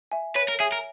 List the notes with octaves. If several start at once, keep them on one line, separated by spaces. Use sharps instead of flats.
E5 G#5
B4 C#5
A#4
G#4 E5 G#5
A#4